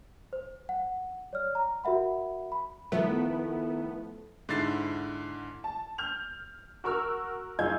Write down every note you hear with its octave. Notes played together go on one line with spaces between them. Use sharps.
C5
F#5
C#5 D5 F6
A#5
F#4 A#4 E5 F#5 B5
B5
D#3 F3 A3 B3 E4 E5
G#2 D3 E4 A6 C7
A5
F6 G6 F7
F#4 A#4 C#6 E6 F6
F#2 D#4 F4 G#4 G6 G#6